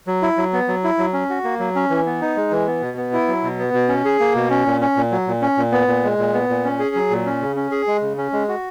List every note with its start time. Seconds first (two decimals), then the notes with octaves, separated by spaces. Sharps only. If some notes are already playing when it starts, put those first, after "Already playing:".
0.07 F#3
0.22 E4
0.38 F#3
0.53 B3
0.68 F#3
0.84 E4
0.99 F#3
1.13 C#4
1.30 F#4
1.44 A#3
1.60 F#3
1.76 C#4
1.90 E3
2.06 B3
2.21 D#4
2.36 G#3
2.51 E3
2.67 B3
2.82 B2
2.97 B3
3.13 E4
3.28 F#3
3.43 B2
3.59 B3
3.74 B2
3.89 C#4
4.05 G#4
4.20 A#3
4.35 B2
4.50 C#4
4.66 A#2
4.81 C#4
4.97 A#2
5.12 F#3
5.27 A#2
5.42 C#4
5.57 A#2
5.72 B3
5.88 A#2
6.04 G#3
6.18 A#2
6.33 B3
6.49 A#2
6.65 C#4
6.79 G#4
6.95 F#3
7.10 A#2
7.26 C#4
7.41 C#3
7.56 C#4
7.71 G#4
7.87 G#3
8.02 C#3
8.18 C#4
8.33 G#3
8.48 F#4